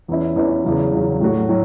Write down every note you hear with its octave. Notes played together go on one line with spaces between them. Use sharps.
E2 E3 C#4 E4
E2 E3 C#4 E4
E2 C#3 F#3
E2 C#3 F#3
A2 F#3 A3 F#4
A2 F#3